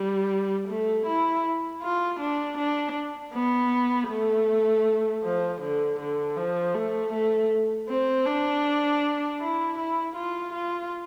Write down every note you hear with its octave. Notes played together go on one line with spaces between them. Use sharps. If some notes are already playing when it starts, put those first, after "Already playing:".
Already playing: G3
A3
E4
F4
D4
D4
B3
A3
F3
D3
D3
F3
A3
A3
C4
D4
E4
E4
F4
F4